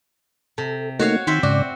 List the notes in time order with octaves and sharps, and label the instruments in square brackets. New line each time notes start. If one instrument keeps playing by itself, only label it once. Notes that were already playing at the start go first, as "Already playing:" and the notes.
[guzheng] C3 [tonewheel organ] A4
[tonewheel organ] A3 A#3 D#4 [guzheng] F#4 C#5 F5
[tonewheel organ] D#3 [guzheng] C4 C5 E5
[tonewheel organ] G#2 C#3 D5 [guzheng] F#4